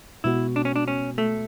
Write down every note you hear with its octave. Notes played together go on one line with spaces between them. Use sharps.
B2 G#3 B3 E4 F#4
D4
C#4
D4
C#4
A3